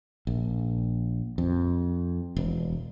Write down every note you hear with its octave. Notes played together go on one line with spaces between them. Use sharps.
A#1
F2
E1